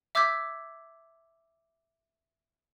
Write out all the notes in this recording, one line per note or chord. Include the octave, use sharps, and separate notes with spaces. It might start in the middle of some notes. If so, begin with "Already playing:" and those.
E5 D6 E6 G6 G#6 B6